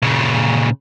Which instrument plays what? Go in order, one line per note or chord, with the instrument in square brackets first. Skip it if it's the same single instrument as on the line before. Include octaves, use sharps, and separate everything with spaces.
[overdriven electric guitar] A#2 C#3